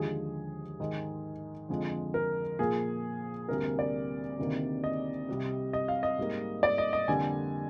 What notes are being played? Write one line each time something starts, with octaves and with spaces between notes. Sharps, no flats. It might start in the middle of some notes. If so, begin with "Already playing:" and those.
Already playing: D#2 D3 F3 G#3 G#4
G#2 D#3 G#3
F2 D3 F3 G#3
A#4
A#2 F3 A#3 G#4
D2 C3 G3 A#3 A#4
D5
D2 C3 D#3 A#3
D#5
C2 C3 G3
D#5
F5
D#5
G#2 G3 A#3
D5
D#5
D#5
F2 D3 G3 A#3 G#5